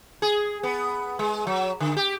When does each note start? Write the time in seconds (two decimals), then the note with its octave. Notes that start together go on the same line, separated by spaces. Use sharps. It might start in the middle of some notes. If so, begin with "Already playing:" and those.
0.22 G#4
0.63 B3
1.19 G#3
1.47 F#3
1.80 D3
1.97 G4